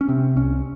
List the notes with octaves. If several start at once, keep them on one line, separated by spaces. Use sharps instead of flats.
C#4
C3 C4
C2 C#4